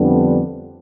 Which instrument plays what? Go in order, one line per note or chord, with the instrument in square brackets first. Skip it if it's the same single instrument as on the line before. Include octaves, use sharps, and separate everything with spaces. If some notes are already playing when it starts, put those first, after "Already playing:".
Already playing: [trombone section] F2 D3 G3 B3 D4